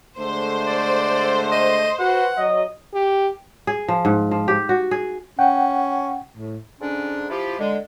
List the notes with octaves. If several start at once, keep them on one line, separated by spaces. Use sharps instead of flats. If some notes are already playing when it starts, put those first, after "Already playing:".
D3 G#3 A3 C5
D5
D#5
F#4 B4 F#5
F#3 D#5
G4
G#4
F3
G#2
F3
G4
F#4
G#4
C#4 F#5 G5
A2
G#2 D3 C#4 D4
F3 E4 F4 G4
D3 G#3